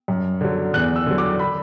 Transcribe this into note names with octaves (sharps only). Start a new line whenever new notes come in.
F#2
D3 F#3
E2 F#6
E6
D3 F#3
D6
B5